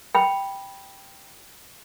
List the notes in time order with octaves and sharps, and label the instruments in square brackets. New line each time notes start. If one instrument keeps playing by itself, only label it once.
[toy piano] G5 B5